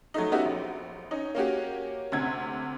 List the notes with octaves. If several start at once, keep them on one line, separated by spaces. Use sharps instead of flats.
F#3 A3 D#4
B3 C#4 D#4 F#4 G4 E5
A#1
C#4 D#4
A#3 C#4 F#4 G4
D2 C3 G#6